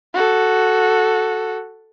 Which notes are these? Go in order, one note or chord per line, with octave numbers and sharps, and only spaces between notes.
F#4 A4